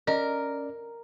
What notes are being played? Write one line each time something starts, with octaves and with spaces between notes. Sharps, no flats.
C#4 A#4 D5 D#5